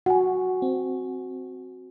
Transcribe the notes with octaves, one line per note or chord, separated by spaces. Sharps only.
F#4 F#5 G#5
C4